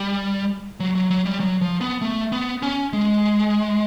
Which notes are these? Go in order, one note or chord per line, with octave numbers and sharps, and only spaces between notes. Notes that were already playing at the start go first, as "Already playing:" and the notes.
Already playing: G3
F#3
F#3
F#3
G3
F#3
F3
B3
A3
B3
C#4
G#3